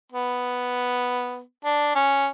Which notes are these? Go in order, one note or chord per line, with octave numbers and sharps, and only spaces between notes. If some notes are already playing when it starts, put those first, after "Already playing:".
B3
D4
C#4